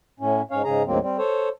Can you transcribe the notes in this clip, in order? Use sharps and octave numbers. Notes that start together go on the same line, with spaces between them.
A2 C#4
G#2 C#4 C#5 F5
G#2 C#3 G#4 A#5
D2 G#2 F#3 A#3 C4
G3 C4
A4 C5 C#5